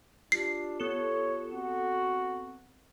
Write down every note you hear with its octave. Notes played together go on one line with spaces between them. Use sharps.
D4 F4 G4 C7
B3 A4 C#5
C4 F#4